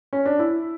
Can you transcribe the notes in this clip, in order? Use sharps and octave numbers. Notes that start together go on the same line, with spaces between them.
C#4
D4
E4